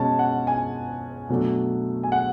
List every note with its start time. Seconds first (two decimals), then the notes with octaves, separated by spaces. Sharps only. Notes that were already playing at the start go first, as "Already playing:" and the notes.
Already playing: B2 G#3 C#4 A5
0.19 F#5
0.47 G#5
1.29 B2 F#3 A3 D4
2.03 G#5
2.12 F#5